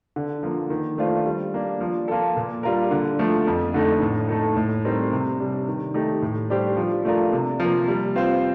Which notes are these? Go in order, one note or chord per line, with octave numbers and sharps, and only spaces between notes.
D3
F3 A#3
D#3
A3 D4 F4 C5
G3
A#3 D4
F3
A#3 F4 A4
A#2
G3 D4 F4 A#4
D3
F3 A3
F2
D3 A3 D#4
A2
A3 D#4 A4
A2
G3 C4 D#4 A#4
C3
G3 D4
D#3
A3 D#4 G4
A2
G3 D4 G4 C5
F3
A3 D4 F4 A#4
C3
F3 A#3
G3
C4 F4 C5